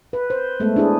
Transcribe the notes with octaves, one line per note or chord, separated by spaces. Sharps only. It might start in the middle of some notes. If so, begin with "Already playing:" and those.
B4
C5
G#3 A3 B3 A4
D4 E4 G#4